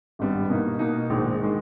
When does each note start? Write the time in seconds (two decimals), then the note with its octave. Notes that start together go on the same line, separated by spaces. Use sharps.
0.19 G#1 G2 G3 B3
0.50 B2 A#3 D#4
0.79 B2 A#3 D#4
1.10 A#1 G#2 D#3 G#3
1.42 D#3 G#3